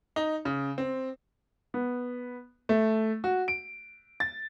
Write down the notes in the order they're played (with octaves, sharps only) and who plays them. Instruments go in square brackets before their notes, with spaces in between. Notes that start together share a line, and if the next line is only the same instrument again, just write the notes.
[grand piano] D#4
C#3
C4
B3
A3
F#4
D7
A6